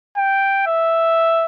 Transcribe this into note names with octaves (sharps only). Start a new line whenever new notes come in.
G5
E5